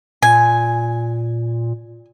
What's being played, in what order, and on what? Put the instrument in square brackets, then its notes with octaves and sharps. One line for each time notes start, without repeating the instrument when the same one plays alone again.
[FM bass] A#2 [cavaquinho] G#5